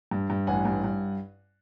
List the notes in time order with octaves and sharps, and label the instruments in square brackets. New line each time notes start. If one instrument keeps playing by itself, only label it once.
[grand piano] G2
G2
A1 F#5 G#5
G2
G2